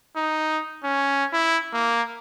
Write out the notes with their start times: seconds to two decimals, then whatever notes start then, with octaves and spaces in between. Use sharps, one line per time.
0.17 D#4
0.84 C#4
1.33 E4
1.74 A#3